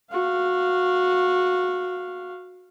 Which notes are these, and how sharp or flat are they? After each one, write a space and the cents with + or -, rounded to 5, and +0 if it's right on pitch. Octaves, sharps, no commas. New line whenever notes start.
F#4 -20 F5 -10